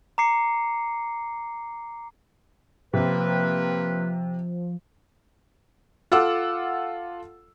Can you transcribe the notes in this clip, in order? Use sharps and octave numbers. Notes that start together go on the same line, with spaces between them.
A#5 D6 C7 C#7
C3 F3 A#3 C4 B4
F4 A4 F#5 D6 E6